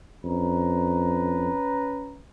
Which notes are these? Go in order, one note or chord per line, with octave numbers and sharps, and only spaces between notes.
F2 C#4 B4 A#5